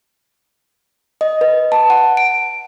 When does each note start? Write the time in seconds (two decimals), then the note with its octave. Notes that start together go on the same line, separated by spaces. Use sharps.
1.21 D#5
1.41 B4
1.72 A5
1.90 F#5
2.17 D7